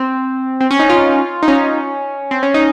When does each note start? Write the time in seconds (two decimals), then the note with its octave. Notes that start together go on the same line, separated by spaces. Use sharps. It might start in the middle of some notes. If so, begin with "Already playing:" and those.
Already playing: C4
0.61 C4
0.71 C#4
0.80 D#4
0.90 F4
1.43 D#4
1.48 C#4
2.31 C4
2.43 C#4
2.54 D#4